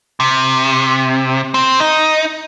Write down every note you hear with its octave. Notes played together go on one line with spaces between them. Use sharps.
C3
C4
D#4